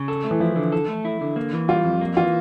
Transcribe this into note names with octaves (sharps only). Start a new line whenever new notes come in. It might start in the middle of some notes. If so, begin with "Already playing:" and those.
Already playing: C#3
A4
A3
E3
F3 E4
D3
A4
A3
E4
D3
A#3
E3
G3 F4
F2
A#3
E3 F4